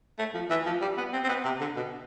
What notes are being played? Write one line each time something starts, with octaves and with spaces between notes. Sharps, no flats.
A3
F3
E3
F3
G3
B3
C4
C4
B3
C3
D3
B2